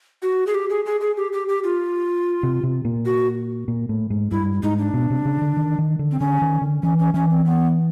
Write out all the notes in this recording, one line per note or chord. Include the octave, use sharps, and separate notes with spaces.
F#4
G#4
G4
G#4
G#4
G#4
G4
G4
G4
F4
C3
C3
A#2
F#4
A#2
A2
G#2
G2 E4
G#2 D#4
D4
B2
C3
C#3
D3
D#3
D#3
D3
C4
D3 C#4
D#3
D3
E3 C#4
C#4
E3 C#4
C4
B3